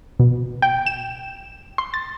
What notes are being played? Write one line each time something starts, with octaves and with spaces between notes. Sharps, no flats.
B2
G5
E7
C6
A6